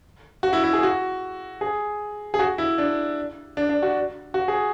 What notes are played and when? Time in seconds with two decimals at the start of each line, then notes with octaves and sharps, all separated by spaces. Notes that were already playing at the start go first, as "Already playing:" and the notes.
0.43 F#4
0.53 E4
0.64 E4
0.73 G#4
0.83 F#4
1.61 G#4
2.34 G#4
2.39 F#4
2.58 E4
2.78 D4
3.57 D4
3.69 D4
3.82 F#4
4.34 F#4
4.48 G#4